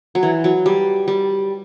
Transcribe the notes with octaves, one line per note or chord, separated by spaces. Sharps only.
F#3
E3
F#3
G3
G3